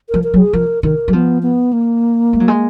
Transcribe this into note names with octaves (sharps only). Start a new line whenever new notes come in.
F3 A#4
A#4
F#3
G#4
F3 A#4
D#3 A#4
F#3
F3 B3
B3
A#3
G#3
F#3
G#3